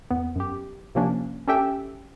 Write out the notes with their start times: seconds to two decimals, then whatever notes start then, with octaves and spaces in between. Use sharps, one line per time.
0.10 E2 B3
0.36 F#2 G4
0.95 C3 F3 A#3 C#4 D4
1.48 C#4 D4 G4 A4 E5 G5